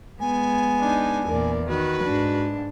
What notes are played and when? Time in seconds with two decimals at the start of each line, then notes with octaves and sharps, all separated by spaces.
0.20 G#3 B3 G#5
0.80 D4 D#4
1.26 E2 A#2 A#4 D5
1.68 D#3 F#4 B4
2.04 G#2 D4